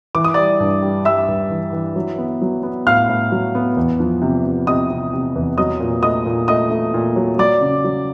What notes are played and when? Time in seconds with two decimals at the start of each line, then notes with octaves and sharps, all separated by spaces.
0.15 E3 D6
0.24 D#6
0.34 G3 D5 D6
0.60 G2
0.82 G3
1.05 G3 E5 E6
1.28 G2
1.50 E3
1.73 E3
1.96 F#3
2.18 B3
2.42 F#3
2.63 B3
2.87 A2 F5 F6
3.09 A2
3.32 F#3
3.55 B3
3.77 E2
4.00 F3
4.22 C3
4.45 C3
4.67 C3 D#5 D#6
4.90 C3
5.13 C3
5.35 E2
5.58 F#3 D#5 D#6
5.80 A#2
6.03 A3 D#5 D#6
6.26 A#2
6.48 A3 D#5 D#6
6.70 A3
6.94 A#2
7.16 F#3
7.38 F#3 D5 D6
7.61 C#3
7.84 F#3